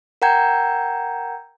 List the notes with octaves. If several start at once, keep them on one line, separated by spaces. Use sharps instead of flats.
A#4 F#5 G5 A#5 G6 G#6